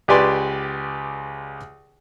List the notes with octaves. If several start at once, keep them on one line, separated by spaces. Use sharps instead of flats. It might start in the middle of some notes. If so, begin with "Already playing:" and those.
C#2 G4 B4 D5 G#5 C6